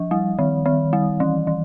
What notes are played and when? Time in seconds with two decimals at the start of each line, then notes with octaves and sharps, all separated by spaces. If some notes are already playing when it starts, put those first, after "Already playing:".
Already playing: F3
0.11 G3
0.39 D#3
0.66 D#3
0.93 G3
1.20 E3
1.47 E3